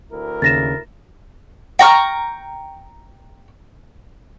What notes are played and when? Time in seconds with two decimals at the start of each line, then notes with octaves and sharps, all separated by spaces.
0.12 D2 E4 A#4
0.42 D#2 C#3 A6 A#6 E7
1.79 G5 A#5 C#6 F6